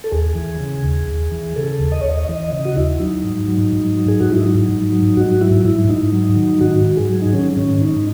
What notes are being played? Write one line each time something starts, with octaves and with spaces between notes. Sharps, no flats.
A4
D#2 G#4
E3
C#3
D#2
D#2
E3
C#3 A4
D#2
D#5
D#2 C#5
D#5
E3 D#5
C#3 D#5
F#4
D#2 E4
F#3 D#4
G#2
F#3
G#2
F#3
G#4
G#2 F#4
E4
F#3 D#4
G#2
F#3
G#2 F#4
F#3 E4
G#2 E4
G#2 D#4
F#3
D#3
G#2 F#4
G#2
G#4
F#3
D#4
D#3 C#4
G#2 C#4
G#2 D#4